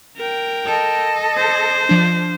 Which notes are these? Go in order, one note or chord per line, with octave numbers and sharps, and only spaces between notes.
A#4 G5
A4 D#5
C5
F3 D4